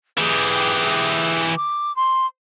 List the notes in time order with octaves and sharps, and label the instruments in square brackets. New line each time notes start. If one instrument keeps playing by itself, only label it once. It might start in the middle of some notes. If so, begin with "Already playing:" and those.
[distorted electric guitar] E3 G4 [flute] G#4
[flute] D6
C6